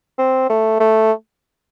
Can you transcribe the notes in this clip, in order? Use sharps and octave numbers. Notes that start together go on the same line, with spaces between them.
C4
A3
A3